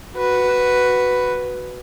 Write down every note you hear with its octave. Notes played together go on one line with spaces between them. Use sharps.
F#4 B4